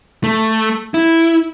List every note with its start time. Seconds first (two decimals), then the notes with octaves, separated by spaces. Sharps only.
0.24 A3
0.94 E4